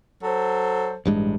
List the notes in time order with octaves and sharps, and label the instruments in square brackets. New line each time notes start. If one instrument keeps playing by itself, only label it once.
[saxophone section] F#3 A4 C5
[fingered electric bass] A1 G2 G#3